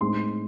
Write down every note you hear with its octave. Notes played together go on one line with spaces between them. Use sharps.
A2 G#3 C4 D#4 C6